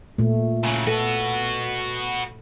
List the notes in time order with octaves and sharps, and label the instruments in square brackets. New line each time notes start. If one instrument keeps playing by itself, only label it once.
[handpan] A#2 A3
[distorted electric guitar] C#3 F#3
[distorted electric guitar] F#4 B4 [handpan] A4